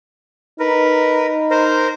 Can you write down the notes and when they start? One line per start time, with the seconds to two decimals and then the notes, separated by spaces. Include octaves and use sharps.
0.59 D#4 A#4 B4
1.51 A#4 C5